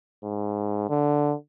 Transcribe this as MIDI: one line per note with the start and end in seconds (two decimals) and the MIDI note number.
0.24 0.87 44
0.89 1.34 50